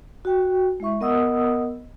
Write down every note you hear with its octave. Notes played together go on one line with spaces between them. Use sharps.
F#4 G5
G#3 E4 E5 C#6
B3 A#4 D#5 F#5 D#6 E6